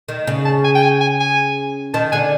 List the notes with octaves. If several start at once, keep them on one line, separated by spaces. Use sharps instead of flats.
D#3
C#3
A5
G#5
G5
G#5
G#5
G#5
D#3 A5
D3 G#5